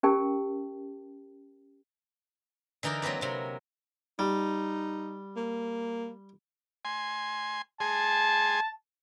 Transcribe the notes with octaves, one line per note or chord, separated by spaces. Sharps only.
C#4 G4 A#4 G5 A5
D3 E3 D#4 A#4 D5
F#3 A#3 C4 B4 D5
C3 F#3
G3 D#4
A#3
G#5 C6
G#4 G#5 A5 C6